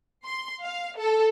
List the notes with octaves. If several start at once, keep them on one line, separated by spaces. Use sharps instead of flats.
C6
F5
A4